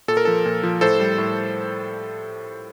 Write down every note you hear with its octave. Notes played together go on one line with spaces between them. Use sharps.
A#2 A4
A#4
F3 A4
A#2
F3
A2 A4 C5
G3
A2